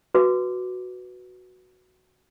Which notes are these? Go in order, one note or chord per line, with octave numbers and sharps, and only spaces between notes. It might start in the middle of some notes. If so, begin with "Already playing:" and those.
F#4 B4 D6